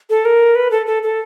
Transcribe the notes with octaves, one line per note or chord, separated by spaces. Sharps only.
A4
A#4
B4
A4
A4
A4